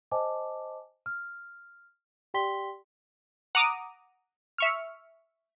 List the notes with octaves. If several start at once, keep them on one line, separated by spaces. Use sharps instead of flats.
C5 D#5 G#5 A5 D6
F6
G4 D5 G5 C6 B6 G7
F#5 A#5 D6 D#6
E5 C#6 F6